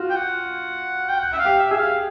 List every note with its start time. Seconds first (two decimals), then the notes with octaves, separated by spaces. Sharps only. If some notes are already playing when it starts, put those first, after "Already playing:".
Already playing: F4 F#4
0.10 G5
0.16 F#5
1.09 G5
1.19 F#5
1.33 E5
1.39 F5
1.45 G4
1.59 E5
1.71 G#4 E5
1.78 F5